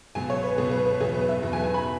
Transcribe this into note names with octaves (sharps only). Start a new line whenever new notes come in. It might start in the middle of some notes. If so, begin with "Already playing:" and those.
C#2 B2 F#3 G#5
C#5
B4
C#2 B2 F#3 G#4
B4
B4
E2 B2 F#3 G#4
B4
E5
E2 B2 F#3
G#5
G#5
B5